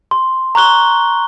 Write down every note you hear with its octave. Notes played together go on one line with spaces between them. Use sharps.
C6
A#5 C#6 F#6 G7